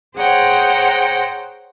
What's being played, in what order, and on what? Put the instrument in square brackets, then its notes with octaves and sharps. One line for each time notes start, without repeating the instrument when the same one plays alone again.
[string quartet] G#4 C5 C#5 F#5 G5 A#5